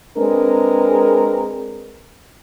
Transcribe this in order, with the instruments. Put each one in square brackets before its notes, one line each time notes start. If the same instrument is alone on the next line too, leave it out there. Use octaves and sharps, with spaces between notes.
[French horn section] G#3 C4 D4 G#4 A#4 B4